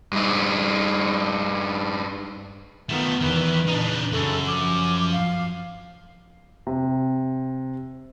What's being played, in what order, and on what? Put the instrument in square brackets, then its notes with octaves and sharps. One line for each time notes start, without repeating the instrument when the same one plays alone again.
[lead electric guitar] G2 D#4
[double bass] D#3 B3 [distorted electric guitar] F3 A3
[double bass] E2 [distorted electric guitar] D#3 E3 [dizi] B4
[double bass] A#2 C#3 [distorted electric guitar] D4 D#4
[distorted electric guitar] F#2 [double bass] C#3 [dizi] A4
[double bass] F3 [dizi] D6
[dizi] F5
[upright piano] C3